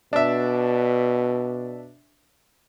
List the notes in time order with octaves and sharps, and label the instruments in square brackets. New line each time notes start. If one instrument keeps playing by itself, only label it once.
[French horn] B2 [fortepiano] D4 E5